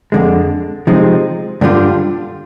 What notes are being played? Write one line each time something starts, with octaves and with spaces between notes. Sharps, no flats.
F2 D3 G#3
C3 F3 G#3 C4 D#4
G2 D3 G3 D4 F4